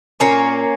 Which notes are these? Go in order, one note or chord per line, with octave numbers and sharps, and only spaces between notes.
A#2 A#3 C#4